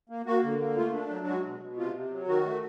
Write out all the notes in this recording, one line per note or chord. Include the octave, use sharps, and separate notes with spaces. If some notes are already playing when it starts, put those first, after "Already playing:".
A#3
A#3 F#4
D3
A#3
A3 F4
D4
F#3
G#3 F#4
B2
B2
C3 F4
C3
F#3
D#3 F#4
A3